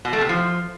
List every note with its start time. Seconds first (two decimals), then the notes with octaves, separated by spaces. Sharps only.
0.05 B2
0.13 A3
0.21 C3
0.29 F3